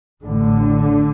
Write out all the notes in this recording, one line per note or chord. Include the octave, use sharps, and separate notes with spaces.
A1 A2 D3